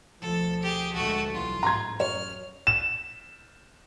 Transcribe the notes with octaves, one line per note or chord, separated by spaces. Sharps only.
D2 B2 F3 A4
G4 G#4
D2 A#2 G#3 A3 F#4
B1 E3 G3 F4
A1 G#2 A#5 C6 G#6
F#2 C#5 F6
E7